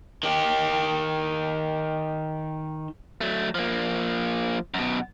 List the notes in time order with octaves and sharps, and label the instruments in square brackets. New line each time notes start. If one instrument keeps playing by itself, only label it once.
[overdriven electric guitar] D#3 G4
[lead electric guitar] F#3 A3
F3 A#3
F#2 B2